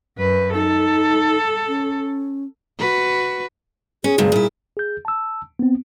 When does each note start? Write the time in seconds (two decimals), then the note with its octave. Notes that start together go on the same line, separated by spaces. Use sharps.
0.18 F#2 B4
0.54 D#4 A4
1.67 C#4
2.79 F#4 B4
4.04 C#4 G#4
4.18 D2 G2 C3
4.32 A#2 E4
4.77 G#4 G6
5.05 A5 E6
5.59 B3 C4